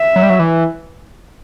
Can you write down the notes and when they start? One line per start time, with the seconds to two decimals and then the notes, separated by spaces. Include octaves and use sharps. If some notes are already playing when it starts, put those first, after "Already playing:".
Already playing: E5
0.16 F#3
0.23 G3
0.30 F#3
0.39 E3